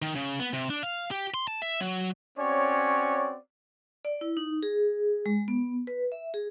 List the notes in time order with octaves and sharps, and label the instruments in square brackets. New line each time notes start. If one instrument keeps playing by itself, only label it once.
[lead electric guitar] D#3
C#3
B3
C3
D4
F5
G4
C6
A5
E5
F#3
[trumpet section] C4 C#4 F#4 C#5 D5
[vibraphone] D5
E4
D#4
G#4
G#3
B3
B4
E5
G#4